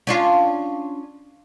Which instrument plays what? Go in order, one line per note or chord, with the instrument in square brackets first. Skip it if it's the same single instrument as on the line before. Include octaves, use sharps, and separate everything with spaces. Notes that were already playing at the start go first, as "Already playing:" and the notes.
[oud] C#4 D4 F4